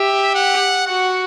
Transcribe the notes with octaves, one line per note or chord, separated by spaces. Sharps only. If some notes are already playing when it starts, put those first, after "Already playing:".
Already playing: G4 E5
F#5
F#4 F#5